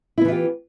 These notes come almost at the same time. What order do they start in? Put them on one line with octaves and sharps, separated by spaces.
E4 B3 E3 F4 G4